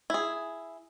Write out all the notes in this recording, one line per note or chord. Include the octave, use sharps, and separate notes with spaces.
E4 G#4